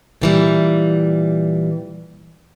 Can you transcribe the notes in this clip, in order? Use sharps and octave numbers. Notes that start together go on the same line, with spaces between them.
A#2 E3 G3